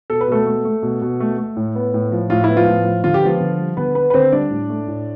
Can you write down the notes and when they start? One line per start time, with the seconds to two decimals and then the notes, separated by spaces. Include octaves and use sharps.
0.10 B2 A4
0.21 B4
0.28 B2 A3 A4
0.47 A3
0.65 A3
0.83 B2
1.01 B2
1.20 A3
1.38 A3
1.57 A2
1.75 B3
1.94 A2
2.12 F3
2.30 A2 F4
2.44 B3 E4
2.57 F3 F4
2.66 A2
2.85 F3
3.04 D3 F4
3.14 G4
3.22 F3 B3 F4
3.40 D3
3.59 G3
3.77 D3 B3 B4
3.95 B3 B4
4.10 B4
4.14 D3 C4 C5
4.32 G3 D4 D5
4.50 A2
4.70 A3
4.88 A2